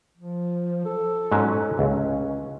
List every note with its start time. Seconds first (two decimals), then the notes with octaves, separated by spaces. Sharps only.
0.17 F3
0.85 A4
1.32 G#2 F#3 C#4
1.79 C#2 C#4